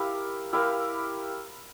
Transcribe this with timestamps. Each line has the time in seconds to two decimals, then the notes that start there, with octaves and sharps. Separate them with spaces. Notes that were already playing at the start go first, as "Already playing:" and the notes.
Already playing: E4 G4 A#4 F5
0.53 E4 G4 A#4 F5